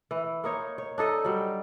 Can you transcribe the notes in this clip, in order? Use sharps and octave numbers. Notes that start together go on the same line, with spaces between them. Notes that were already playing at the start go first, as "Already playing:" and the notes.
E3
A#3 D#4 C#5
C#5
D4 D#4 A4 D#5
F#3 G3